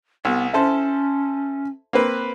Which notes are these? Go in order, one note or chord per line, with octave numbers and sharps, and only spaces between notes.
C2 B3
C#4 E4 A4 C5
A#3 C4 B4